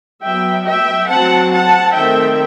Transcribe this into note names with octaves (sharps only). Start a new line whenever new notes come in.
F#3 B3 E5 G5
E5 G5
F#3 C4 F#5 A5
F#5 A5
D#3 A3 C4 E5 G5